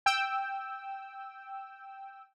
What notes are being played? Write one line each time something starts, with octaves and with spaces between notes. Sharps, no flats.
G5 E6